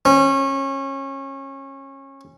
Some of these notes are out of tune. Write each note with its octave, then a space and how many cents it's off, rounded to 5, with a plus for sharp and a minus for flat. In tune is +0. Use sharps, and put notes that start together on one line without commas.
C#4 -25